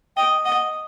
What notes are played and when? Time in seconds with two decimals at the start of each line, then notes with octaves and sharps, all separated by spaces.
0.17 D#5 G5
0.45 D#5 F#5